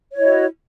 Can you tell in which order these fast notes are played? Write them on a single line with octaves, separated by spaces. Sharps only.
C#5 E4 D#5 F#4